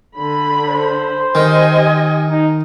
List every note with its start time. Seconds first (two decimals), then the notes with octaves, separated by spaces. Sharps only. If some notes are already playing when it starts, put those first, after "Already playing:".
0.15 D3 B5
0.68 C5
1.35 D#3 G4 D#5 G#5
2.30 D#4